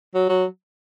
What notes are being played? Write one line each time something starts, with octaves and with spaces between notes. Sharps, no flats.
F#3
F#3